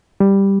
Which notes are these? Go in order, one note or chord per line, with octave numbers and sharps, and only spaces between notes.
G3